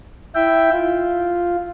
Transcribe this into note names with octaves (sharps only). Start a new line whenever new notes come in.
E4 E5 G5
F4